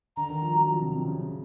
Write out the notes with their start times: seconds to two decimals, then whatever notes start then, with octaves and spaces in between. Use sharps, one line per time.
0.17 D3 A#5
0.30 D#3
0.42 F3
0.54 F#3
0.68 F3
0.80 C3
0.92 C3
1.06 C#3